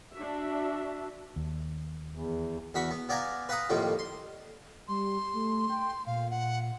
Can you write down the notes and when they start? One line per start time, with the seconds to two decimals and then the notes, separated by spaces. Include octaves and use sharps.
0.14 D4 F#4 E5
1.36 D#2
2.11 E2
2.74 E2 F#4 B5 C#6
2.91 B3
3.09 B3 D5 F5 G#5 A#5
3.49 B4 F5 F#5 A#5 D#6
3.69 F2 A2 D#3 F3 G3 A#3
3.99 C6
4.88 G3 C6
5.33 A3
5.69 G5
6.06 A#2 F5
6.30 F#5